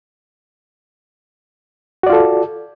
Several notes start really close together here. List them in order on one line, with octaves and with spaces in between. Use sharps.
F#4 D5 F4 A4